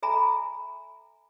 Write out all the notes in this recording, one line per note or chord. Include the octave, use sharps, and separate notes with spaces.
A4 E5 G#5 A#5 B5